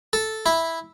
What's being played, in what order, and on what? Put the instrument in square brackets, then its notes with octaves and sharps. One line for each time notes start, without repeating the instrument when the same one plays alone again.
[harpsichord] A4
E4